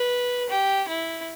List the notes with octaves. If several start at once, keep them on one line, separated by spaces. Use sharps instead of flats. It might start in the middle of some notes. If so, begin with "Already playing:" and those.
Already playing: B4
G4
E4